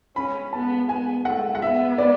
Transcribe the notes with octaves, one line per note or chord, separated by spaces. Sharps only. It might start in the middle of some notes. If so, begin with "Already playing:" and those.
C#4 B5
B3 A5
B3 G#5
A3 F#5
F#5
B3 E5
D5